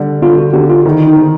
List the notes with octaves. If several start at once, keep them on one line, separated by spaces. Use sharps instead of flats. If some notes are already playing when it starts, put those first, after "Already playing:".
Already playing: D3 G3
D3 F4
F#4
D3 G4
F4
D#3 E4
D#4
D#3